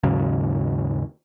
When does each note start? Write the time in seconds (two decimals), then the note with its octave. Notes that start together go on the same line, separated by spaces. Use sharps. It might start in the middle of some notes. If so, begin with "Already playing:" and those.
0.03 D#2 G#2 C#3 F#3